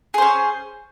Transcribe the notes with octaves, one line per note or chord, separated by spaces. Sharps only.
C#4 G#4 C5